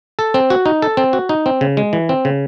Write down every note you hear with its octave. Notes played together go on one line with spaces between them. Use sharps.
A4
C4
F#4
D#4
A4
C4
F#4
D#4
C4
C#3
G#3
E3
C4
C#3